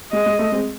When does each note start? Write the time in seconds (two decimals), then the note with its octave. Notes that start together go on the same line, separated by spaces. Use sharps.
0.12 G#3 D#5
0.26 G#3
0.39 A3
0.52 G#3 C4